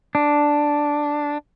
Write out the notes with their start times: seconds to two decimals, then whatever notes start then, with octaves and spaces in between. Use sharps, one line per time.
0.15 D4